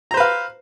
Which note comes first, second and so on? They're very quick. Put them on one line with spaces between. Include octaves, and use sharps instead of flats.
A#5 C5 B4 F5